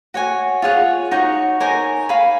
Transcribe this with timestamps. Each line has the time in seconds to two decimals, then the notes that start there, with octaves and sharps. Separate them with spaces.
0.14 F#4 C#5 G#5
0.62 F4 G#4 C#5 F#5
1.11 D#4 F#4 C#5
1.60 D#4 A#4 C#5 G#5
2.09 C#5 F5 G#5 B5